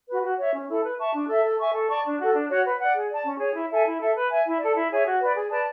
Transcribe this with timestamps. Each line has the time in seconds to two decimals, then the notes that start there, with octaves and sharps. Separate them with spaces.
0.08 F#4 B4
0.23 F#4
0.39 C#5 E5
0.54 C#4
0.69 E4 A4
0.84 B4
0.99 E5 A5 C#6
1.14 D4
1.29 A4 E5
1.44 A4
1.58 E5 G#5 C#6
1.74 A4
1.89 D5 A5 C#6
2.05 D4
2.19 F#4 A4
2.34 D4
2.49 F#4 C#5 F#5
2.65 B4
2.80 D5 F#5
2.94 G#4
3.10 D5 A5
3.25 C#4
3.40 G#4 C#5
3.55 E4
3.71 A4 E5 G#5
3.86 E4
4.01 A4 E5
4.15 B4
4.30 E5 G#5
4.46 E4
4.60 A4 D5
4.75 E4
4.91 G#4 C#5 E5
5.05 F#4
5.20 B4 D5
5.36 G#4
5.51 B4 D5 A5